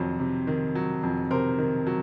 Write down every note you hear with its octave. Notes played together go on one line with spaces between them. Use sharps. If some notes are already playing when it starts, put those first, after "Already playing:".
Already playing: F2 C3 D#3 F#3 C5 C#5
C3
D#3
F#3
F2
C3 A#4 C5
D#3
F#3